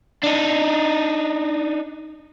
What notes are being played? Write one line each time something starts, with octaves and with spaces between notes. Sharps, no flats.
D4 D#4